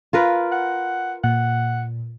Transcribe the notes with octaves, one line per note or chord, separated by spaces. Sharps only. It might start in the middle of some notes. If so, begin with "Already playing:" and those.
F4 A#4 B4
F#5
A#2 F#5